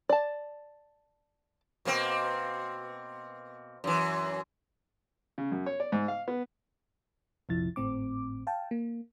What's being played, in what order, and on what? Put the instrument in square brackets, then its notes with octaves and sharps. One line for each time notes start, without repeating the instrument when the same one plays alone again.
[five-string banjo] D5 A5
[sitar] B2 A#3 C4
F#2 E3
[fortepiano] C#3
F#2
C#5
D5
G#2
F5
B3
[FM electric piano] A#1 F2 C3 F3 E4 A6
G#1 A2 C4 D6
F5 G5 A5
A#3